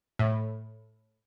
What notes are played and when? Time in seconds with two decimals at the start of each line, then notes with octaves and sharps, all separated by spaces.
0.19 A2